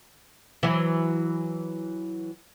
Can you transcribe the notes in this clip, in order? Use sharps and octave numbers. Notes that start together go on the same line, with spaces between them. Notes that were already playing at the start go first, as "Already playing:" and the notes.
E3 F#3